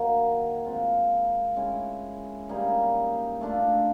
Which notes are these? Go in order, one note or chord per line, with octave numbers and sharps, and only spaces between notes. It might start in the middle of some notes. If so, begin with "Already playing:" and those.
Already playing: D#3 F#3 A#3 D#4
G#3 C4 F4
G#3 C#4 E4
G3 A#3 D#4 G#4
A3 D4 F4